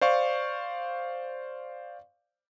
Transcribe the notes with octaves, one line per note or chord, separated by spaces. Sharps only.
C5 D5 F5 C#6